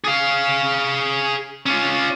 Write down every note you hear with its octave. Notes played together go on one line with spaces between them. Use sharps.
G#4 F5
C#4 F4